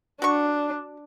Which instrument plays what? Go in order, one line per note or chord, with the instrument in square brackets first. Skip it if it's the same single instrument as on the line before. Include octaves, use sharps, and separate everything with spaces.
[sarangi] D4 [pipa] F#4 C#6